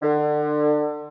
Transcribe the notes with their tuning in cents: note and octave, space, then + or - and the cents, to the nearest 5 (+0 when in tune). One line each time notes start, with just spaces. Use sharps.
D3 +30